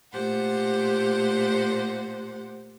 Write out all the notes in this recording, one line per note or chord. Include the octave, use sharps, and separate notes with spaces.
A#2 A3 G4 C5 F#5